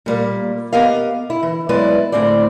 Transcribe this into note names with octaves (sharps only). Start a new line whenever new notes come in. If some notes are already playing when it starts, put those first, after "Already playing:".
A#2 G3 A#3
B3 G4 A#4 D#5 F5
E4
E3
F#3 G#3 B3 E4 B4 D5
D2 A2 C4 G#4 C5 D5